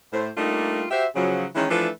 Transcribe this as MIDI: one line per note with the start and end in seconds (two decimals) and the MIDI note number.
0.13 0.30 45
0.13 0.30 72
0.36 0.84 55
0.36 0.84 57
0.36 0.84 58
0.36 0.84 62
0.36 0.84 63
0.36 0.84 65
0.91 1.06 66
0.91 1.06 67
0.91 1.06 72
0.91 1.06 76
1.15 1.46 49
1.15 1.46 53
1.15 1.46 54
1.55 1.65 51
1.55 1.65 52
1.55 1.65 56
1.55 1.65 61
1.70 1.89 52
1.70 1.89 53
1.70 1.89 57
1.70 1.89 62
1.70 1.89 69
1.70 1.89 71